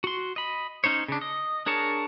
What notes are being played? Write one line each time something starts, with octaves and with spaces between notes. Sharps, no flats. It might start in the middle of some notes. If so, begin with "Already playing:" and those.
F#4 C6
D#5 B5
C#4 D#4 C5 C#5
C#3 D4
D#5
D4 G#4 A#4 C#5 A5